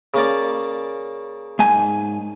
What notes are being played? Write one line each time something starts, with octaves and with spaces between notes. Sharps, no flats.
C#3 A#3 D5
G#2 G#5